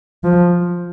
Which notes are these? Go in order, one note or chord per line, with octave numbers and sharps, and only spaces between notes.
F3